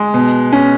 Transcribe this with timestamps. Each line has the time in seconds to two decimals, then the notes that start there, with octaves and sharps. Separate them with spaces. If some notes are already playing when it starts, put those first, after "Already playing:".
Already playing: G#3
0.14 B2
0.52 C#4